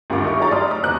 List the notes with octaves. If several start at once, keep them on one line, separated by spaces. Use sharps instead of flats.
G#1 D2 G2 F4 A#4 D6
D#4 E4 A#4 E5 C#6
F#3 D#4 G4 G#4 A#5 A6
A2 D5 C6 D#6 F6
A#5 D#6
F#1 D#2 C5 D#5 D6 F#6